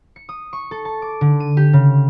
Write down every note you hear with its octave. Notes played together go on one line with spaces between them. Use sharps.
C#7
D#6
C#6
A4
A5
D6
D3
D#7
G4
C#3